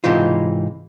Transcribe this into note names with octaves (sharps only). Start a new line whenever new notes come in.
G#2 C3 E3 D#4 F4